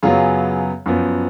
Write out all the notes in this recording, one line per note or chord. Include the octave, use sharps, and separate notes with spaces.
F#2 C#3 F#3 B3 F4 G#4
F#2 F3 B3